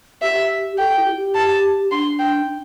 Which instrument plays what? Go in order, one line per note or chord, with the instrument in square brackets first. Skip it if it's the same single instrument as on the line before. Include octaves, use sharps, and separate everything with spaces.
[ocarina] G4 [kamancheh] E5
[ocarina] A4 [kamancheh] G5
[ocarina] E4
G4
[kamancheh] A5
[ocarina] D4 [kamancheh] C6
[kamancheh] G5
[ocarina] D4